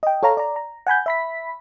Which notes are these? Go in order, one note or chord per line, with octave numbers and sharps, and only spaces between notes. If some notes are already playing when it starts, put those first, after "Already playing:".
D#5 G5
A4 C#5 F5 A#5
D5 A#5
A#5
F#5 G#5 B5 G6
E5 B5 B6